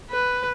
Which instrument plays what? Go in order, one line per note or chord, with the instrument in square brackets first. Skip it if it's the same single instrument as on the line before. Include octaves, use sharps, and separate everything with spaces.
[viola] B4